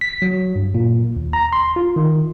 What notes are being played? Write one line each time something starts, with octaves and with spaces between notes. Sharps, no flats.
B6
F#3
G2
A#2
D#2
A#5
C6
F4
D#3